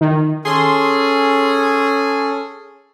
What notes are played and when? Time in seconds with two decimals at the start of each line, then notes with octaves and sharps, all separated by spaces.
0.01 D#3
0.45 C#4 G#4 A4 C6